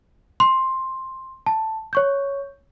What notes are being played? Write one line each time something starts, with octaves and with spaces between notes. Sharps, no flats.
C6
A5
C#5 C#6 G6